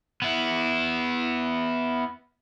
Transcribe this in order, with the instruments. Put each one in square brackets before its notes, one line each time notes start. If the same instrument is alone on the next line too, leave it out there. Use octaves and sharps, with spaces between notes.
[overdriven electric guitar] B3 E4